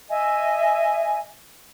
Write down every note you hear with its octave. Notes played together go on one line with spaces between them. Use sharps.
D#5 E5 G#5